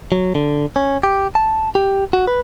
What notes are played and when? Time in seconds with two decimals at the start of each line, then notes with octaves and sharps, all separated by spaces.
0.12 F#3
0.35 D3
0.76 C#4
1.03 G4
1.35 A5
1.75 G4
2.13 F#4
2.27 B4